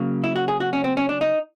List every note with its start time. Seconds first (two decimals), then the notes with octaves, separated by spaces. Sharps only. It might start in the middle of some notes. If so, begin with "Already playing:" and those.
Already playing: C#3 F#3 A#3
0.24 E4
0.36 F#4
0.48 G#4
0.60 F#4
0.73 C#4
0.84 C4
0.97 C#4
1.09 D4
1.21 D#4